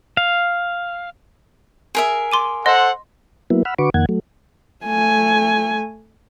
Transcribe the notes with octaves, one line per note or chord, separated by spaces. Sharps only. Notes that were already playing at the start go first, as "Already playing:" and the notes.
F5
G#4 A#4 E5
C6 D6 D#7
A4 C5 D#5 F#5 C6
F#3 A#3 B3 E4
F#5 B5 E6 F6
D3 F#4 B4 C#6 D6
F2 D#3 A#3 F#5 G#6
F#3 A3
A3 G#5